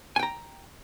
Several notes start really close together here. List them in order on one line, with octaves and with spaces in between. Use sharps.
G#5 G5 A#5